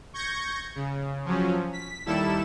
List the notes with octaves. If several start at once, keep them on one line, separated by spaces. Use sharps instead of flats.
C#6 G6 G#6 A#6 C#7
C#3
F3 F#3 C#4
B6
D#2 G3 E4 A4 E7